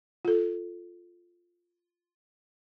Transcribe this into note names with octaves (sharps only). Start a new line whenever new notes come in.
F4 A4